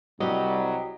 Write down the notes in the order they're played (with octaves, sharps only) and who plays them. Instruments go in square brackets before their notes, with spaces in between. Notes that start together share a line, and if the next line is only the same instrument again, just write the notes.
[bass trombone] C2 [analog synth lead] F#3 [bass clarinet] G3 [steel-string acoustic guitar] G4 D#5